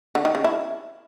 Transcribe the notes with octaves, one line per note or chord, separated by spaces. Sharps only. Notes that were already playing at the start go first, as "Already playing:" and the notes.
D3
D#3
C#3
E4